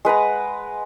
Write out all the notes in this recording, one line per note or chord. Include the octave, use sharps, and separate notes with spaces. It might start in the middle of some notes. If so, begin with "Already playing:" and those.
G#3 B4 F#5 A#5